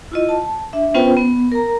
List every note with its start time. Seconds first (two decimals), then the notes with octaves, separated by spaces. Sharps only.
0.12 E4 F4 D#5
0.29 A5
0.73 D4 E5
0.94 B3 C#4 F4 B4 C5 G5
1.17 B3
1.52 A#4 A#5